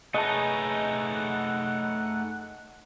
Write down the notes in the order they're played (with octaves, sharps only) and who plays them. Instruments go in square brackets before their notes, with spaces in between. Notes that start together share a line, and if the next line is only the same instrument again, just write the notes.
[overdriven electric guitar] A3 D#4 [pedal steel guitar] G#4 B4 C#5 [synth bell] D#5 A5 [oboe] F#5